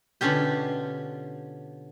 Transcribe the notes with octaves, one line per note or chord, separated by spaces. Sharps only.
B2 D3 C#4 F4 G4